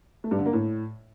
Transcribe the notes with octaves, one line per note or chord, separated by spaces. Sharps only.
A3
G2
D3
A#3
A2